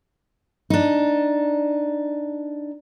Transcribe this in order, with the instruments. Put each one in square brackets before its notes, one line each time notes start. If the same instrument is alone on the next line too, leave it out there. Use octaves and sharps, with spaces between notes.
[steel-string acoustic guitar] D4 D#4